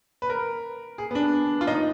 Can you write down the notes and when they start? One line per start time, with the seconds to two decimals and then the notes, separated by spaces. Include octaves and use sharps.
0.22 B4
0.30 A#4
0.98 G#4
1.11 B3
1.15 D4
1.61 F4
1.67 D#4